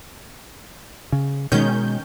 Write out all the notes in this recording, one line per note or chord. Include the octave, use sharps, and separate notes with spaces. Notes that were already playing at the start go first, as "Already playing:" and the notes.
C#3
B2 D#3 G#3 C#4 G6